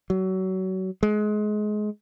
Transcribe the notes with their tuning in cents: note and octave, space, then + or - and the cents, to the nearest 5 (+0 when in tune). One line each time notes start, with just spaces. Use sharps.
F#3 +25
G#3 +25